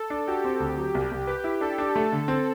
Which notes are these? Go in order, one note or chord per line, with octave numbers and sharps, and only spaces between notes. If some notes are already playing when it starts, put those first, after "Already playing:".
Already playing: A4
D4
F#4 G4
C4
D2
F#3
C2
C2
G4 B4
E4
D4 A4
D4
A3 A4
D3
C4